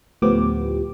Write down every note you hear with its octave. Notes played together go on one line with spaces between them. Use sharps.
D2 A2 F3 B3 G4 D6